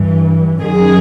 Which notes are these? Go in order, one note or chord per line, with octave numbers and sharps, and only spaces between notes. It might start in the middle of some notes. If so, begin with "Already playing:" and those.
Already playing: G2 E3
F#2 D#3 G#4